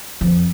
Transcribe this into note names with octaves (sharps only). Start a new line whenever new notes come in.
F2